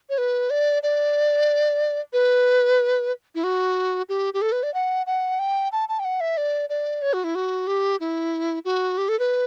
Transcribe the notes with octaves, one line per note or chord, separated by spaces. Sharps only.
C#5
B4
D5
D5
B4
E4
F#4
G4
G4
A4
B4
D5
F#5
F#5
G5
A5
A5
G5
F#5
E5
D5
D5
C#5
F#4
E4
F#4
G4
E4
F#4
G4
A4
B4